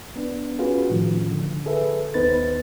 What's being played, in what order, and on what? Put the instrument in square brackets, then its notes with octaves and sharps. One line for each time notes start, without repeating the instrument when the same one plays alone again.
[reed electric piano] B3 D4
C#4 F4 F#4 G#4 B4
A2 D#3 F3
D3
G#4 A4 B4 E5
D#2 B3 D#4 B4 C5 A6